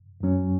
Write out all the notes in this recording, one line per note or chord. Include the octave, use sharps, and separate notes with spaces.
F#2 F#3 C#4